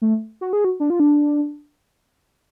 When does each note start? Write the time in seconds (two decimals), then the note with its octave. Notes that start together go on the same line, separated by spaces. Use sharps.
0.02 A3
0.41 F#4
0.53 G#4
0.64 F#4
0.80 D4
0.90 F4
1.00 D4